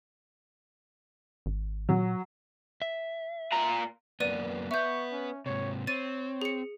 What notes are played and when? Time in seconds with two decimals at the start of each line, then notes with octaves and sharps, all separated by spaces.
1.46 G#1
1.89 A#2 F#3
2.82 E5
3.52 A#2 A#5
4.20 F#2 A#3 B3 B4 D5 D#7
4.71 B3 B4 E5 C#6 G6
5.12 C#4
5.46 G#2 C3 C#5
5.87 C4 C#5 A6 D#7
6.42 G#4 C#7